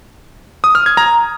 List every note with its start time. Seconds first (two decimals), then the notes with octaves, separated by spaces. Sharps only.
0.64 D#6
0.75 F6
0.86 G#6
0.97 A#5